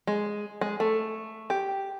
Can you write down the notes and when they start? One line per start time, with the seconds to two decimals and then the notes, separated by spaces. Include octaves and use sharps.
0.07 G#3
0.61 G#3
0.80 A3
1.50 G4